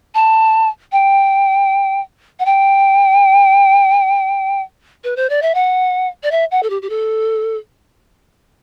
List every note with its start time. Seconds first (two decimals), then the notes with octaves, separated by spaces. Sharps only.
0.15 A5
0.92 G5
2.39 F#5
2.46 G5
5.04 B4
5.16 C5
5.30 D5
5.42 E5
5.55 F#5
6.23 D5
6.31 E5
6.51 F#5
6.63 A4
6.70 G4
6.82 G4
6.90 A4